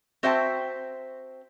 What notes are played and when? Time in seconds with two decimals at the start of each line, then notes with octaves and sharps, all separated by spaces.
0.23 C4 F#4 C5 E5 G5 A5